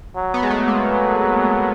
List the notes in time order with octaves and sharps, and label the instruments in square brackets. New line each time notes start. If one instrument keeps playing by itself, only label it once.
[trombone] F#3
[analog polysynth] B3
G#3
A3
A#3